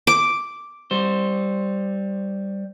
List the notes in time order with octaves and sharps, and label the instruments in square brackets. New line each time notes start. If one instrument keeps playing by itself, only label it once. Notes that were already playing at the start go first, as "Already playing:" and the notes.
[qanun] D6
[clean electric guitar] G3 C5